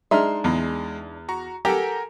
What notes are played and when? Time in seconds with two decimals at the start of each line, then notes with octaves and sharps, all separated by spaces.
0.11 G#3 D4 D#4 E5 C6 F6
0.44 E2 G#3
1.29 F#4 A#5 C#6
1.65 G4 A4 A#4 F#5 G#5 A#5